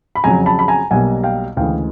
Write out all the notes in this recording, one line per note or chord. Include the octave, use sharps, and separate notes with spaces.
B5
F2 C#3 F#3 G#5 A#5
A5 B5
B5
G#5 A#5
B1 B2 G3 A#3 F#5 G#5
F5 G5
D2 C#3 E3 G#3 F5 G5